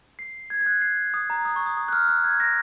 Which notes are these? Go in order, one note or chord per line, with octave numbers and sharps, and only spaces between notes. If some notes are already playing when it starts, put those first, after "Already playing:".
C7
G#6
G#6
F#6
C7
D#6
A#5
D#6
C#6
D#6
D#6
F#6
F6
F6
F#6
G#6
A#6